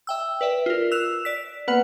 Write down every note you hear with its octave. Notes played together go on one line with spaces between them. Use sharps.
E5 G5 E6
B4 D5 E5
F4 A#4
E6 F#6 E7 F7
D5 B6
A#3 B3 B4 F#5